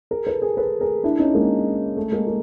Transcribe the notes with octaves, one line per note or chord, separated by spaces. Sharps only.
G#4 A#4
A4 B4
G#4 A#4
A4 B4
G#4 A#4
D4 E4
C#4 D#4
G#3 A#3
A3
G#3 A#3
A#3